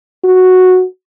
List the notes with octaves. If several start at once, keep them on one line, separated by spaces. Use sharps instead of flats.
F#4